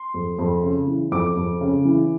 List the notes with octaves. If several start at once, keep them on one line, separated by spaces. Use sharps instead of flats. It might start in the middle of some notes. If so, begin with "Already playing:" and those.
Already playing: C6
F2
F2
C#3
E3
F2 D6
F2
C#3
E3